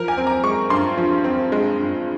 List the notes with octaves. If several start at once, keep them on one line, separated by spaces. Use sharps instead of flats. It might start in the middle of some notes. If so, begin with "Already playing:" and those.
Already playing: F3 A#4
G#5
C4
A#5
G#3 C#6
G2 C6
F3
C4
G#3
G2